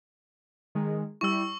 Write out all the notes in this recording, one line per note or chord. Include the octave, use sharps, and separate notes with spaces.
D#3 G#3
G3 E4 C#6 E6